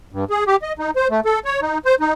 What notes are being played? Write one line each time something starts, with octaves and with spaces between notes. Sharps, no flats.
G2
G#4
G4
D#5
D#4
C5
A3
A4
C#5
D#4
C5
D#4